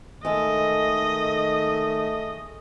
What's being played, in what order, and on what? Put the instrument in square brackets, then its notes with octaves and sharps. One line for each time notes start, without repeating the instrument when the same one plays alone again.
[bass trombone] D#3 [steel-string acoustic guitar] G#3 A4 [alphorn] A3 [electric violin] D#5